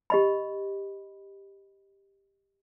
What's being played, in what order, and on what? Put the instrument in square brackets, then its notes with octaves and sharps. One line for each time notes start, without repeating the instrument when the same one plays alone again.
[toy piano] G4 D#5 B5